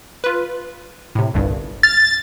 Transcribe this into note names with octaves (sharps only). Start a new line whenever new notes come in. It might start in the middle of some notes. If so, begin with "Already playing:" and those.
F4 B4
A2 C3
G1 C2 G2
F6 A6